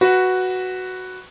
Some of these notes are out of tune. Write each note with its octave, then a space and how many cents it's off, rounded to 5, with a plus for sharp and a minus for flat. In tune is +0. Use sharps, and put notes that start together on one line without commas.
F#4 +0 B4 +0